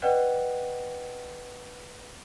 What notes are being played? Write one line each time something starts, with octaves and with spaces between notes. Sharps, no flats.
B4 D5 D#5 F#5 G5 F#6